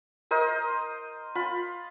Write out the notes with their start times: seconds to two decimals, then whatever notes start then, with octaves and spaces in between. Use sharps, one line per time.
0.31 A#4 C5 D#5
1.35 F4 B5